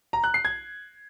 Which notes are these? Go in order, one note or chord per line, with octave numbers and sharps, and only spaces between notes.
A#5
F#6
C7
G#6